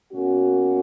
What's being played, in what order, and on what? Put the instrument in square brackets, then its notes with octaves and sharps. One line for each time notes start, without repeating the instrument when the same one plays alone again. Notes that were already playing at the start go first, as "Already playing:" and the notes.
[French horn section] B2 A#3 C#4 F#4